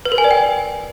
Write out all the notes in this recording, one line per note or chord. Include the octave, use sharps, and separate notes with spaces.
B4
A#4
G#5
D5
G5